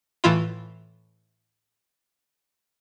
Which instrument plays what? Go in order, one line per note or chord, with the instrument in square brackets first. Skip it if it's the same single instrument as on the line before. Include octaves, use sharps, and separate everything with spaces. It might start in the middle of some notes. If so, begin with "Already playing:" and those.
[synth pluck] A2 E3 E4 F4